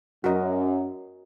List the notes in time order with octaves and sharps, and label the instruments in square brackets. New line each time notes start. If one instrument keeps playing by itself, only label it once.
[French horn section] F#2 [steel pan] F#4 A#4 D#5